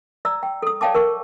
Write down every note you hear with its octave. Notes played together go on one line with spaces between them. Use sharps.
D5 A#5 E6
G5
A4 D#6
C#5 D5 F5 G5 A5 D6
A#4 C#6